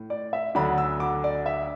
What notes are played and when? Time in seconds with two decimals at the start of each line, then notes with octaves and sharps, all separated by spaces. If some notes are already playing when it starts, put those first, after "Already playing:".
Already playing: A2
0.10 D5
0.33 E5
0.55 D2 D3 F#3 D4 B5
0.78 E6
1.00 D6
1.24 D5
1.46 E5